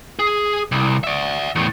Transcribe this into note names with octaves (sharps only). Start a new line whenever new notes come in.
G#4
C2
D5 E5
E2 A2